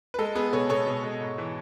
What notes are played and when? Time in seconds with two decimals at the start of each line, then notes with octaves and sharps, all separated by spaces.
0.14 B4
0.18 G#3 A4
0.35 B3 G#4 B4
0.52 B2 A4 C#5
0.69 B2 A4 C#5
0.87 B2
1.04 G#3
1.20 G#2
1.38 E3